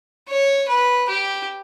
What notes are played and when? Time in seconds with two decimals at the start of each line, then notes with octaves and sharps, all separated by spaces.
0.29 C#5
0.69 B4
1.09 G4